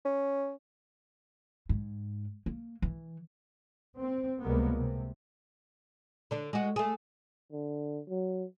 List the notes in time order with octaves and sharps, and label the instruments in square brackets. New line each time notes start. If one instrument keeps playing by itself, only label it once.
[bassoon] C#4
[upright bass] G#2
A#3
E3
[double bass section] C4
C#2 C3 G3 G#3 A#3 B3
C3
[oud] D3 D4
G#3 F#4
A3 G#4
[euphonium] D3
F#3